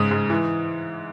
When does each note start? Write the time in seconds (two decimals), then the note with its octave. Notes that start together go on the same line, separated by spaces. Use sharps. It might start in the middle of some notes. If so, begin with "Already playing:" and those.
Already playing: G#2 C#3 D#6
0.11 G#2
0.30 E3